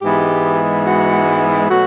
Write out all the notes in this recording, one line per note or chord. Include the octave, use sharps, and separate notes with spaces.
G#2 E3 G#3 B3 G4
F#4
B2 F#3 A3 F#4